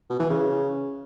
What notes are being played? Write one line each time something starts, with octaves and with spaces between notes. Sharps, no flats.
B2
E3
C#3